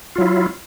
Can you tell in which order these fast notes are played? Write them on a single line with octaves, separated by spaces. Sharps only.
F4 F#3 E4